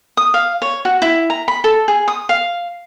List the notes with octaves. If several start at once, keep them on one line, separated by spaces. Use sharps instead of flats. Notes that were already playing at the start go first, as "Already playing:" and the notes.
D#6
F5
C#5
F#4
E4
A#5
B5
A4
G#4
D#6
F5